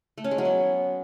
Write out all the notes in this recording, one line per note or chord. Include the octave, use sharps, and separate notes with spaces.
A3
C#4
G#3
F#3
B3